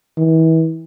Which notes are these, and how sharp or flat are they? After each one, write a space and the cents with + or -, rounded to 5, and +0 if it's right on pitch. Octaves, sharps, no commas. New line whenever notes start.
E3 -35